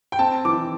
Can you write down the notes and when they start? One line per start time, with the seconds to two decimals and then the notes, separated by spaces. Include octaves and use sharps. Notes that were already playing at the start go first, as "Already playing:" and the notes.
0.12 G5
0.19 C4 A5
0.45 E3 D6